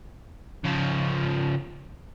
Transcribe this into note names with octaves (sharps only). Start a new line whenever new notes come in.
C#3 F3